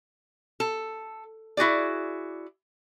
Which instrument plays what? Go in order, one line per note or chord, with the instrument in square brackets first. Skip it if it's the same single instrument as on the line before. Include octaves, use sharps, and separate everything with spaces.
[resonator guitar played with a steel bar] A4
E4 F#4 G#4 D5